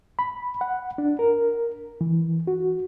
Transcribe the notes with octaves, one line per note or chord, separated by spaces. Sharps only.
B5
F#5
D4
A#4
E3
F#4